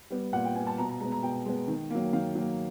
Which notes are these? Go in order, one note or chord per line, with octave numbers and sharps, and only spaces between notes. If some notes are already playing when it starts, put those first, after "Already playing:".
G3 B3
A#2 F#5
G5
G3 B3 G#5
A5
B2 A#5
A#5
G#3 B3 A#5
A#5
B2 G5
G#3 B3
D#3
F#3 A#3
D#3 F5
F#3 A#3